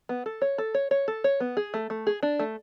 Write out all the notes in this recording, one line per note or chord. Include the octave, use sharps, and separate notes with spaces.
B3
A4
C#5
A4
C#5
C#5
A4
C#5
B3
G#4
A3
A3
G#4
D4
A3